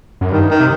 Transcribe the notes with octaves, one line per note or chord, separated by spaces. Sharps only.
F#2
G2 D#3
D#3
C3